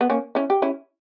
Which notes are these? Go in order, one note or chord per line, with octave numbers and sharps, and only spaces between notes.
B3
A#3 C#4
C#4 E4
G4
C#4 E4